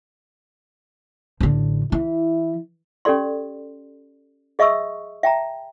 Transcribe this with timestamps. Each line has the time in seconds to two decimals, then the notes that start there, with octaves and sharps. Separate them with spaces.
1.41 A1 D3
1.92 E3 E4
3.05 C#4 G4 A4 D5 C6
4.59 G#4 D#5 E5 C#6 D#6 E6
5.23 E5 G5 A5 A#5